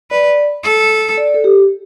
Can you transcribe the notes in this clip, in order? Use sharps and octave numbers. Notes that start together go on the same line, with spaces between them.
B4 D5
A4
D5
A4
G4